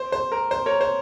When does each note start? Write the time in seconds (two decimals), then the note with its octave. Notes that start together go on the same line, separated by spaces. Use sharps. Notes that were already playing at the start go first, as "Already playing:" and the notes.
Already playing: C5
0.12 C5
0.32 A#4
0.51 C5
0.66 A#4 C#5
0.81 C5